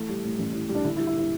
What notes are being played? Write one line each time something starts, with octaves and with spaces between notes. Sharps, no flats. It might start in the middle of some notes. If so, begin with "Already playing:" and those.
Already playing: E3 A3
G3
A2
A1
E3
G3
D4
D3 E4
E4
G3
E4
E4